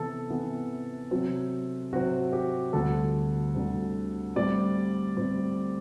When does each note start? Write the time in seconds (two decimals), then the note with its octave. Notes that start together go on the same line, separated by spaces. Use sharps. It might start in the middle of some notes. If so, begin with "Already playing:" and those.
Already playing: C3 E3 B3 A4
0.30 C3 E3 B3
1.11 C3 F#3 C4
1.93 C3 F#3 C4 F#4
2.33 G4
2.73 D2 D3 G3 C4 A4
3.55 D2 D3 G3 C4
4.36 A2 G3 C4 D5
5.17 A2 G3 C4